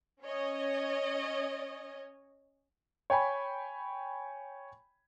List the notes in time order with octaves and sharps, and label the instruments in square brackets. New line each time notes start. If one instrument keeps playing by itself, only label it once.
[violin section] C#4 C#5 D#5
[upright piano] C#5 G5 G#5 B5